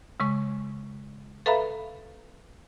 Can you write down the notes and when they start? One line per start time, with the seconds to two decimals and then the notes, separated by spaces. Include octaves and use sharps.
0.20 C#3 G#3 C#6
1.46 A4 B4 E5 F5 A#5 B5